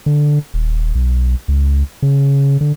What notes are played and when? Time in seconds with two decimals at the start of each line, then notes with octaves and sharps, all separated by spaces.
0.06 D3
0.54 D#1
0.95 B1
1.48 C#2
2.02 C#3
2.61 D3